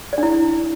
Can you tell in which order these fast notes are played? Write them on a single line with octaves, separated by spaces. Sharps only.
D5 D4 E4